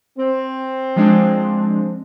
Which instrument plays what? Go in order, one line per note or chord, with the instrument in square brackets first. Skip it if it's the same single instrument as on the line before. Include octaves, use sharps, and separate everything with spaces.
[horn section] C4
[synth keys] F3 G#3 D4